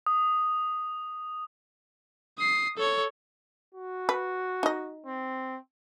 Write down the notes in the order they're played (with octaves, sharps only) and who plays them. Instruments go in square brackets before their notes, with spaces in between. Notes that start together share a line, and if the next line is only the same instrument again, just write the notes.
[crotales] D#6
[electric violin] D#6 C7
A4 C#5
[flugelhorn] F#4
[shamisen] B4
D#4 D#5
[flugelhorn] C4